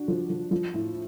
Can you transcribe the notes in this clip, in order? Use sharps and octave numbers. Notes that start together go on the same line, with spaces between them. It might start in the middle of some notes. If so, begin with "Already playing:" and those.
Already playing: D4 F#4
F3
F3
F3
A2